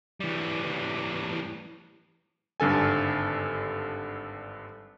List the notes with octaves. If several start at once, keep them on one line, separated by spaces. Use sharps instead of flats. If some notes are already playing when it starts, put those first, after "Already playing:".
E3 G3
G#1 G2 D3 A4 G#5